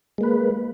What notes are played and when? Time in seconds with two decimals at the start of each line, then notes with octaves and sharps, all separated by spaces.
0.18 G#3
0.21 A#3
0.23 B4